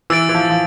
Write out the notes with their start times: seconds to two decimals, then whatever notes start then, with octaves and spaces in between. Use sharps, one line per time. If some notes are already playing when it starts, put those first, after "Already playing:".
0.10 E3 E6 A6 D7
0.29 E3
0.35 F3
0.50 F3